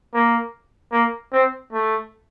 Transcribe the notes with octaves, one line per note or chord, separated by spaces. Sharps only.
A#3
A#3
C4
A3